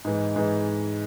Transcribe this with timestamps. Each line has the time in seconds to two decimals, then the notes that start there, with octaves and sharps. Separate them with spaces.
0.05 G#2 E3 G#3
0.36 G#2 E3 G#3